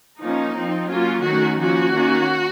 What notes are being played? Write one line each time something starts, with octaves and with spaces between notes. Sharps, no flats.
F3 A#3 C#4 D#4
F3 C4
F#3 A#3 C#4 F4
D#3 F#3 A3 C#4 F#4
F3 A#3 C#4 F#4
D#3 A#3 C#4